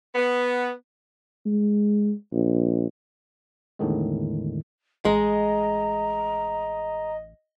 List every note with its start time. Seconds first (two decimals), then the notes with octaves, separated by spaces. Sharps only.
0.15 B3
1.46 G#3
2.33 A#1
3.79 E2 A2 D3 D#3 G#3
5.05 A1 G#3 D#5 A#5